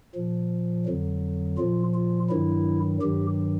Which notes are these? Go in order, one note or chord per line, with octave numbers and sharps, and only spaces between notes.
A#2 F3
F2 D3 F#3
A#2 F3 F4
F4
G2 D#3 F#3 E4
G2 D#3 F#3 G4